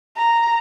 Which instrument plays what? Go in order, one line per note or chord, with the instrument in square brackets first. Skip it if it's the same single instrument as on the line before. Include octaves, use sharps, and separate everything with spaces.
[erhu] A#5